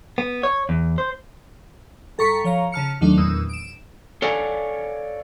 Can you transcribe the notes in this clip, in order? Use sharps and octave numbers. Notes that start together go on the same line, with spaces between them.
B3
C#5
E2
C5
G1 A4 A#5 C#6 B6 C#7
F3 C#5 F5 A#5
C#3 A5 F6 C#7
D#2 D#3 F#3 A3 D4
E2 A#2 B3 D#6 E6
D7 E7
A4 C#5 D5 F5 F#5 G#5